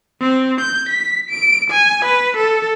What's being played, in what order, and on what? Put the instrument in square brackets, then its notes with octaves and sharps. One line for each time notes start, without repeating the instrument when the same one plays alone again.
[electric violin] C4
G6
B6
D7
G#5
B4
A4